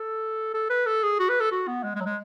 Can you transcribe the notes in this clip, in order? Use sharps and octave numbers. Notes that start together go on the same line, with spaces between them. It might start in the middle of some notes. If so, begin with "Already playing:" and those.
Already playing: A4
A4
B4
A4
G#4
F#4
B4
A4
F#4
B3
G#3
G#3
F#3
G#3